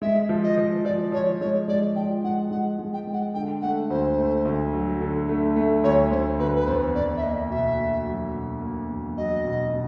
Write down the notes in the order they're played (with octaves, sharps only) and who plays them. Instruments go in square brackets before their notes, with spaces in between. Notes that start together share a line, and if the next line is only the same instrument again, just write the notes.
[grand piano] G#3 [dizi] E5
[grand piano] F3
[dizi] D#5
[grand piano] F3
[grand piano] F3 [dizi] D5
[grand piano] F3 [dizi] C#5
[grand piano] G#3 [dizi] C#5
[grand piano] G#3 [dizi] D5
[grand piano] F3 [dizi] G5
[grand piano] G#3 [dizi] F#5
[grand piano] G#3 [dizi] F#5
[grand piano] G#3
[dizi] G5
[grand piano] G#3
[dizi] F#5
[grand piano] D3 [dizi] G5
[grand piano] A3 [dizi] F#5
[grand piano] D2 [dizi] C5
[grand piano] A3
D2
F#3
D3
A3
A3
[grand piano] D2 [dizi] C#5
[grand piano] D2 [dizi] C5
[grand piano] D2 [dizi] B4
[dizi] B4
[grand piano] E2 [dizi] C5
[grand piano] E2 [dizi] D5
[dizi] E5
[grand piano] A#3 [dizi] D#5
[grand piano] B2 [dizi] E5
[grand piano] A#3
F#3
B2
A#3
E2
[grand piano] F#3 [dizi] D#5
[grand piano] B2
B2